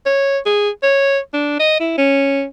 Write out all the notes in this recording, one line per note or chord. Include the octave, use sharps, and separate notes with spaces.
C#5
G#4
C#5
D4
D#5
E4
C#4